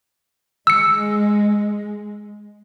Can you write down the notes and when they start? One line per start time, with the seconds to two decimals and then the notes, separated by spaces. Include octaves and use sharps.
0.67 G#3 E6 C#7